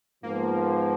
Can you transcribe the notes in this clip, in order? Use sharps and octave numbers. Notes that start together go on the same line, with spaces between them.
G#2 F3 A#3 B3 F4